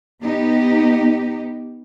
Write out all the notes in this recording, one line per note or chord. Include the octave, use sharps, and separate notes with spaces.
B3 D#4 G4